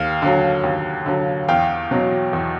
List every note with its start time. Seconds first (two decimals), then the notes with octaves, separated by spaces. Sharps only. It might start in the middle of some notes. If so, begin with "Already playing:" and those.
Already playing: D#2 F5
0.22 D3 F#3
0.64 D#2
1.06 D3 F#3
1.48 E2 F5 G5
1.91 B2 F#3
2.33 E2